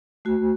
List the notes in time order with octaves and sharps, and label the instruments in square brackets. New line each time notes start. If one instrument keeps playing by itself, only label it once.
[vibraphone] A3 F#4